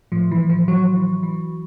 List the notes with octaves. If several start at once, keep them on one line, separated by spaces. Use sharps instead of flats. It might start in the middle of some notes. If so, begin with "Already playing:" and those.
A2 F3
E3
A2
F3
E3 F#3
E3
E3